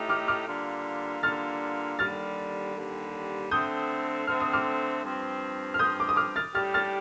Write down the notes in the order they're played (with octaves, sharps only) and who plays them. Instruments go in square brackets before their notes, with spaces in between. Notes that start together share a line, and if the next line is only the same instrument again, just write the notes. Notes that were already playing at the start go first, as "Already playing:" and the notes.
Already playing: [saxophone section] A2 A3 D#4 G4
[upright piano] D6 F6
D6 F6
[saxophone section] D3 G3 A#3 F4
[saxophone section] D3 G3 A#3 F4 [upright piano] F6 A6
[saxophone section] D#2 D3 G3 [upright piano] F6 A6
[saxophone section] D#2 D3 G3
[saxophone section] D3 A3 C4 [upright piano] D#6 G6
[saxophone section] D3 A3 C4 [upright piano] F6
[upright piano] D#6
D6 F6
[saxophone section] G2 F3 C4
[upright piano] F6
[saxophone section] G2 F3 C4 [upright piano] D#6 G6
[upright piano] D6
D#6
D6 F6
F6 A6
[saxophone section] A2 G3 D4 G4 [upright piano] F6 A6
[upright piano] F6 A6